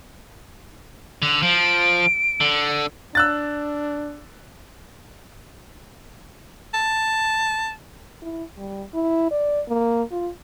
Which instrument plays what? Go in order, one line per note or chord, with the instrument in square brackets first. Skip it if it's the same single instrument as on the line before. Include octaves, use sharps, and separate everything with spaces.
[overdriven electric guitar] D3 [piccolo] F7
[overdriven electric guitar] F3 [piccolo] D7
[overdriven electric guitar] D3
[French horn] D4 [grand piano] E6 F#6 A6
[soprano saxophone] A5
[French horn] E4
G3
E4
D5
A#3
F4